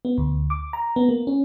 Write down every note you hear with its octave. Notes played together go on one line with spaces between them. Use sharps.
B3
D2
D6
A#5
B3
A#3
C#4